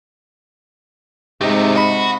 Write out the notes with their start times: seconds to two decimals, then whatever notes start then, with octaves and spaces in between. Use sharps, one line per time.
1.41 G#2 C3 G#3 A3 D#4 G4 D#5
1.76 F#4 D#5 B5